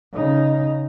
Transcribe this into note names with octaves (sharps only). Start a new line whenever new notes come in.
C#3 D#4